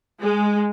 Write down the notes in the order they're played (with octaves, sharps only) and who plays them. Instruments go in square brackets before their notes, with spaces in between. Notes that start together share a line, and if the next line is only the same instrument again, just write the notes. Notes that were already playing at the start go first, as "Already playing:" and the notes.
[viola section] G#3